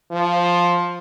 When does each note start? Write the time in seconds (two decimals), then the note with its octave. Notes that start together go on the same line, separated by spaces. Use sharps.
0.12 F3